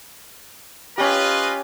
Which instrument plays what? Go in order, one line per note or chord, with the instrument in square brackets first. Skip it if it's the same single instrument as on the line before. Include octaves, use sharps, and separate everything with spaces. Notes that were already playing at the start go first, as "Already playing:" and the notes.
[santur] C#4 G4 [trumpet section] F4 B4 D#5